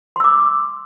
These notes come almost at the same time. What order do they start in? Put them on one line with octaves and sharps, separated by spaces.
C6 E6 D6